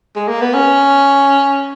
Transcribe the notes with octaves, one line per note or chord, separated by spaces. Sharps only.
G#3
A#3
B3
C#4